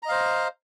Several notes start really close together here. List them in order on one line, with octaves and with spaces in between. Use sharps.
A#5 D#5 F5 C5